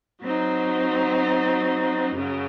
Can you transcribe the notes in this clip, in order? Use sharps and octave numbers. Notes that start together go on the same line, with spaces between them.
F#3 C4 D#4
F#2 C#3 F#3